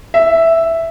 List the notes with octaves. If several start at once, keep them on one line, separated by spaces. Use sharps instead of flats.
E5